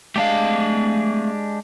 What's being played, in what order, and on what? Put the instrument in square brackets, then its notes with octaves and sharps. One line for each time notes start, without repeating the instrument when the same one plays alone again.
[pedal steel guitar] G#3 D4 G4 [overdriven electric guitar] A3 F5